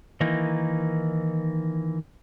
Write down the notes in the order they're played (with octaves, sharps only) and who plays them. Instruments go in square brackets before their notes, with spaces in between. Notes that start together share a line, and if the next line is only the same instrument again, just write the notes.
[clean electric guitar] D#3 E3 A#3 D#4